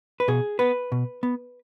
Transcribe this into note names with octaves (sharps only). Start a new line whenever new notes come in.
B4
B2 G#4
B3 B4
B2
B3